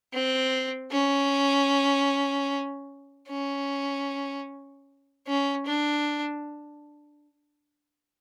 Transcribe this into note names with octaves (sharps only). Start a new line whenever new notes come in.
C4
C#4
C#4
C#4
D4